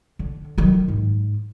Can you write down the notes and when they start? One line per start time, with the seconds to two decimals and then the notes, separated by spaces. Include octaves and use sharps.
0.19 D3
0.58 D#3 F#3
0.88 G#2